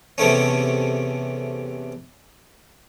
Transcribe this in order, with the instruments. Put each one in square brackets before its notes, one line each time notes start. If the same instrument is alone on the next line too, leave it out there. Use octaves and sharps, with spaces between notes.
[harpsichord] E2 C3 A3 C#4